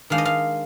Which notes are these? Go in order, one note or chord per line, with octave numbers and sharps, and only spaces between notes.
D#3 G#3 D4 F5
D#5
F5